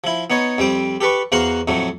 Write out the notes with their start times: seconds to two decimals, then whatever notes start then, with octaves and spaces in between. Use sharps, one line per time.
0.04 F3 E4
0.30 B3 D#4 C#5 D#5
0.58 F2 G3 C4 G5
1.01 G4 A4 B4 C#6
1.32 E2 F#4 C5 F5 F#5 A#5
1.68 F2 A2 F#3 A3